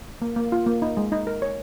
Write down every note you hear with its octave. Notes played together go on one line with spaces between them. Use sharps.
A#3
A#3
F4
A#3
D#4
G#3
D#4
A#4
C#5